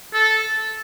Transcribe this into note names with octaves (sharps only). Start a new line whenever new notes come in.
A4